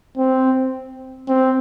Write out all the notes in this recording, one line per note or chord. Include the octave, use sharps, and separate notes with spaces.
C4
C4